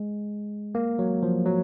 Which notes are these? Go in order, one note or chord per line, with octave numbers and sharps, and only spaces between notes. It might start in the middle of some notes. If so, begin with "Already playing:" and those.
Already playing: G#3
A#3
F#3
F3
F#3